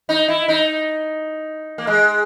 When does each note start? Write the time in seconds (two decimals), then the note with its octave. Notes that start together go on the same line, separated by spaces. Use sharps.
0.09 D#4
0.28 E4
0.48 D#4
1.78 A#3
1.87 G#3